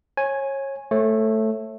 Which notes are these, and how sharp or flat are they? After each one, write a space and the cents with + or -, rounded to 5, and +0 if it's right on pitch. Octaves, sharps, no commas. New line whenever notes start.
C#5 -25 G#5 +0
A3 +0 C#5 -30